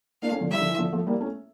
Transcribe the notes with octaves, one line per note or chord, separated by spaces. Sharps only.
A#3 D4 F5
A3 C#4
D3 F3
E3 G3 E5
D3 F3
E3
D3 F3
F3 A3
G3 A#3
A3 C#4